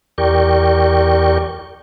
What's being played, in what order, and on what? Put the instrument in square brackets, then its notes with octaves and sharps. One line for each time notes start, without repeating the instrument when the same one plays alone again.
[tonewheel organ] E2 G4 A#4 D5 G5 C#6